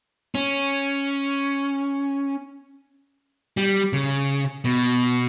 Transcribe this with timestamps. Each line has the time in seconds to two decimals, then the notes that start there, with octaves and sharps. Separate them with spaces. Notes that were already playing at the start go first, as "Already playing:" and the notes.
0.35 C#4
3.57 G3
3.93 C#3
4.65 B2